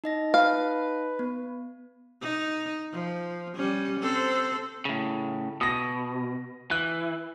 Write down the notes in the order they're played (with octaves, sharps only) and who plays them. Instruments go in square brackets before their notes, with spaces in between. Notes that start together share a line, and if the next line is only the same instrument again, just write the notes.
[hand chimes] D#4 D#5 A#6
[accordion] B4 [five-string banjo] F5
[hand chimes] B3
[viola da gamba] D#4
F3
G3 C#4
C4 A4 C5
[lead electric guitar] A2 C#3
[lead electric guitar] B2 [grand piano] D#6 A#6
[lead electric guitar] E3 [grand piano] F#6